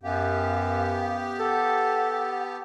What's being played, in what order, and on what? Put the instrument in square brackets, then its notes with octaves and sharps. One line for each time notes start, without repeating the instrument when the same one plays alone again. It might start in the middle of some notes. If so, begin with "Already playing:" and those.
[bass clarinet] F#2 [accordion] B3 G4 [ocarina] F5
[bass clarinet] A4 [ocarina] F#5